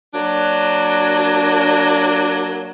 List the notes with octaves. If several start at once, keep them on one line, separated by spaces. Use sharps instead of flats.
F#3 A#3 D4